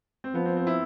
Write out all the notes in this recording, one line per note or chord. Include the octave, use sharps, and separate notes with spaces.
C4
F3 B3
C4
C4
E4